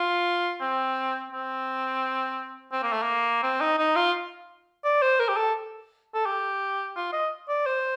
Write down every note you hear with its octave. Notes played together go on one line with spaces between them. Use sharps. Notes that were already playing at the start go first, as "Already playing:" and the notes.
Already playing: F4
C4
C4
C4
A#3
A3
A#3
C4
D#4
D#4
F4
D5
C5
A#4
G4
A4
A4
G4
F4
D#5
D5
C5